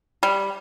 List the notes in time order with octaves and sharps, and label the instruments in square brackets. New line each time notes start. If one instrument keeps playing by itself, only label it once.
[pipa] G3